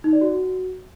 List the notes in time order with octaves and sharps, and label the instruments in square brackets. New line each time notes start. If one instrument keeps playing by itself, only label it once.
[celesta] D#4
D5
F#4